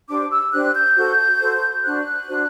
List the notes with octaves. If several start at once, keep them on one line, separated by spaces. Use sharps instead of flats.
D4 G4 C5 D6
E6
D4 G4 C5 F#6
G6
F#4 A4 C5
F#4 A4 C5
D4 F#4 C5 F#6
D4 F#4 C5